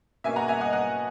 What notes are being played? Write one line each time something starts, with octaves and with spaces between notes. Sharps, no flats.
B2 A#3 C#4 E5 G#5
F#5 A#5
E5 G#5
D#5 F#5
D#5 F#5